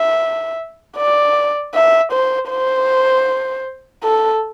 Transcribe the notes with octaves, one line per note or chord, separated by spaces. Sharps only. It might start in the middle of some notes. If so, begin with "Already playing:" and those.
Already playing: E5
D5
E5
C5
C5
A4